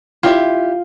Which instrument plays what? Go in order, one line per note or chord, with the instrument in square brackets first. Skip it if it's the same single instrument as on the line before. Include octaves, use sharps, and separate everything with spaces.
[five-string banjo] E4 G4 E5 [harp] F4